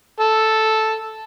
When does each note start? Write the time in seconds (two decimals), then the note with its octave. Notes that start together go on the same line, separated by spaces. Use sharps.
0.20 A4